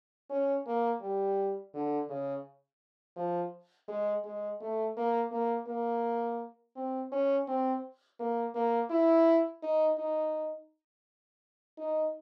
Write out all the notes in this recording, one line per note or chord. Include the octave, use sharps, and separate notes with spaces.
C#4
A#3
G3
D3
C#3
F3
G#3
G#3
A3
A#3
A#3
A#3
C4
C#4
C4
A#3
A#3
E4
D#4
D#4
D#4